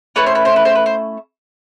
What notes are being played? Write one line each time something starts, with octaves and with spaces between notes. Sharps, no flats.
A3 C#4 E4 B4
C5
B4
C5
B4
C5
B4
C5